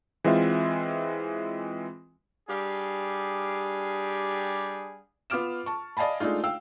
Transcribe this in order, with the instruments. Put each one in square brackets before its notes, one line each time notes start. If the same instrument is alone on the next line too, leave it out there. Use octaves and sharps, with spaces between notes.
[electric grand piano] E3 G#3 C4 F4 E5
[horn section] G3 D4 G4 G#4 F5
[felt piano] B3 F4 D6 F6 D7 E7
A5 C#6
D5 D#5 F5 G#5 A5 B5
G#3 A3 D4 D#4 F4
F5 G5 E6